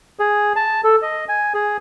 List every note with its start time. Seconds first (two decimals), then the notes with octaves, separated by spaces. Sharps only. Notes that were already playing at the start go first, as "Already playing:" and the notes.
0.19 G#4
0.56 A5
0.84 A4
1.02 D#5
1.29 G#5
1.54 G#4